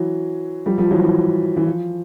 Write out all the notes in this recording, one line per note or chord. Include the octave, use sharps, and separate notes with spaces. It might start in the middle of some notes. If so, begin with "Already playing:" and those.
Already playing: E3 F#3
F3 G3
F3 G3
E3 F#3
E3
E3
F3